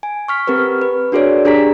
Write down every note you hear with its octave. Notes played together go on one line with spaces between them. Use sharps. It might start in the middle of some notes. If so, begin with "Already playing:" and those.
G#5
C#6 F6 B6
C4 G4 A#4 B4
B4
D4 F#4 G#4 A#4 C#5 D5
D4 G4 G#4 A#5 B6